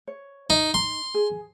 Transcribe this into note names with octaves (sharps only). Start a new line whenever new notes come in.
C#5
D#4 D#5
D#4 A#5 C6
G#4